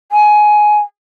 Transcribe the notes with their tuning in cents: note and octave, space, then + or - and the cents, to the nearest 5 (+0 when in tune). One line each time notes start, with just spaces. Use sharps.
G#5 +15